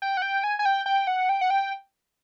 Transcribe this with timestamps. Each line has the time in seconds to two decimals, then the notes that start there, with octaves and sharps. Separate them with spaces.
0.02 G5
0.17 F#5
0.22 G5
0.44 G#5
0.59 G#5
0.65 G5
0.86 G5
1.07 F#5
1.29 G5
1.41 F#5
1.50 G5